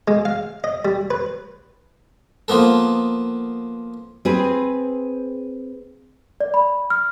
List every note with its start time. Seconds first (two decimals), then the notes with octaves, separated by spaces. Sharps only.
0.08 G#3
0.25 F5
0.64 D#5
0.85 G3
1.11 B4
2.48 F3 A#3 B3 A4
4.25 C4 G#4 B4
6.40 D5
6.54 B5
6.90 F6